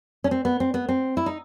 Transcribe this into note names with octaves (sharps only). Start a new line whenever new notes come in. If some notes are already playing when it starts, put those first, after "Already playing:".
C#4
C4
B3
C4
B3
C4
E4
D#4